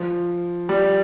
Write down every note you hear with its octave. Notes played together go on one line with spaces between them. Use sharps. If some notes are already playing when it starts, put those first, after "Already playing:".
Already playing: F3
G3